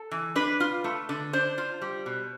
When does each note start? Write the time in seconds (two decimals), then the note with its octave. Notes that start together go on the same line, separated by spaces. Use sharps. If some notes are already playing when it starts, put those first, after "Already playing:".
Already playing: A4
0.11 E3
0.36 D4 B4
0.60 F4
0.84 A3
1.09 D3
1.33 D4 C5
1.58 F4
1.81 G3
2.06 B2